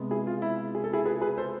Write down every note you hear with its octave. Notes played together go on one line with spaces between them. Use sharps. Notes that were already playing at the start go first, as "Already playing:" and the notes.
Already playing: C3 G#3 B3
E4 G#4
F4
E4
G#4
A4
E4 G#4
G#4 B4
G#4 B4
A4 C5